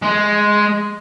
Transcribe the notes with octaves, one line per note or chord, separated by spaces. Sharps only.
G#3